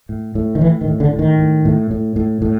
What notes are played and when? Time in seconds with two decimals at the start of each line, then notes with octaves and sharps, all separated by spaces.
0.09 A2
0.35 A2
0.55 D#3
0.61 A2 E3
0.81 D#3
0.87 A2
1.00 D3
1.13 A2
1.19 D#3
1.39 A2
1.65 A2
1.91 A2
2.16 A2
2.42 A2